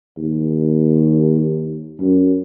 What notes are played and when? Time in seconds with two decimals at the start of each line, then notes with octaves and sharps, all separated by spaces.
0.17 D#2
2.00 F#2